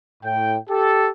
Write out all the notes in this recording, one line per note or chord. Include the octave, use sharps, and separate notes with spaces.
A2 G5
G4 A4